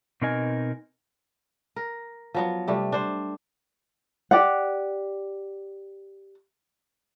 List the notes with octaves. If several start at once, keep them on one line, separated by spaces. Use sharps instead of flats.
B2 C4 D#4 A#4 D#5 G#5
A#4
F3 F#3 B3
C3 G3 A3
D4 C5
G4 D5 F#5